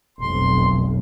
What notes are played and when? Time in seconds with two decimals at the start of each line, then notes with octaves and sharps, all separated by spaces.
0.18 F1 B1 C6